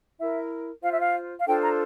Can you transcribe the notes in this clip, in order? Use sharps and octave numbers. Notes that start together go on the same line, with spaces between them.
E4 A#4 E5
F4 C5 F5
E5
F5
F5
D4 F4 A4 C5 G5
A#5